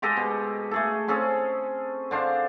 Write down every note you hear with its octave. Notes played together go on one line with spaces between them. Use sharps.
G#3 G4 A4 D#5
B2
A3 G#4 A4
C4 C#4 G#4 A4
D3 D4 C5 F5